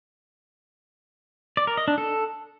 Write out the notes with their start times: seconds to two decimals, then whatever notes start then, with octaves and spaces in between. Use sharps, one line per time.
1.57 D5
1.67 A#4
1.77 D#5
1.88 D4
1.98 A4